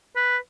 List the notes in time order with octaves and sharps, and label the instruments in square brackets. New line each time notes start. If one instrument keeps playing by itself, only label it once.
[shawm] B4